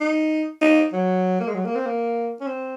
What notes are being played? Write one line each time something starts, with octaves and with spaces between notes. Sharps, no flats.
D#4
D#4
F#3
A#3
G#3
F#3
A#3
C4
A#3
C#4
C4